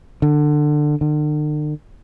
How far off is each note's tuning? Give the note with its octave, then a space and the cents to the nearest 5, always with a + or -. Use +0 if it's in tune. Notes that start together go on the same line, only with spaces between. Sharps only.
D3 +20
D3 +45